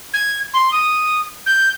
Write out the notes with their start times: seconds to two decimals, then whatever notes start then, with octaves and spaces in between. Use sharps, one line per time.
0.14 G#6
0.54 C6
0.72 D#6
1.46 G6